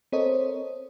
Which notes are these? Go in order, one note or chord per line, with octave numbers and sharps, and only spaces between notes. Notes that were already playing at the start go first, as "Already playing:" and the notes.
C4 A4 A#4 C5 C#5 D#5